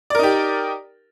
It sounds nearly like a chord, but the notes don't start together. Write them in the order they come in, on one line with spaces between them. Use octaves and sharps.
D5 A#4 D#4 G4